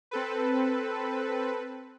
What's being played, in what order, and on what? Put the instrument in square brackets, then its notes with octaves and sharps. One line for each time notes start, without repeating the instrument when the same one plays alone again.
[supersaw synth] C4 A4 B4